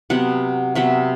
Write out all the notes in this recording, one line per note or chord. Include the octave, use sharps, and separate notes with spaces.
C3 F#3 B3 F#5
C3 F#3 B3 E5